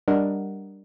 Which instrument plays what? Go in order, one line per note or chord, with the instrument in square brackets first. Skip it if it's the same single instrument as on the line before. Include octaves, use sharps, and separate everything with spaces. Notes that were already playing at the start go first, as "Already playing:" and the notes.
[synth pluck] G3 D4 A#4 D#5 F#5